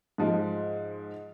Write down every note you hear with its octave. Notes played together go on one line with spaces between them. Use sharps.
G#2 F3 G#3